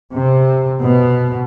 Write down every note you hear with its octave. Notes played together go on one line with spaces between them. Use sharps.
C3
B2